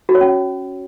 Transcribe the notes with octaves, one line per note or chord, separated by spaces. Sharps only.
F#4
C#5
C#4